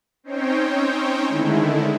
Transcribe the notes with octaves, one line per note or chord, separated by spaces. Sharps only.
C4 C#4 D#4 C5 C#5 G5
D3 D#3 G#3 A3 E4